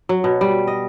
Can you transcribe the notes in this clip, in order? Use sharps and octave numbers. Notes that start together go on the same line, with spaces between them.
F#3
B2
G3
D#5